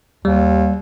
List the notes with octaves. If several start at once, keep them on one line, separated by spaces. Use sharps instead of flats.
D#2 G3